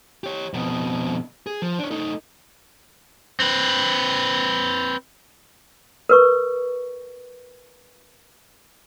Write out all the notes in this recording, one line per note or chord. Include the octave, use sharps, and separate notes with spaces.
G4 C#5
F2 B2
G#4
F3
D4 C#5
A3 D#4
C4 B4
A#4 B4 C#6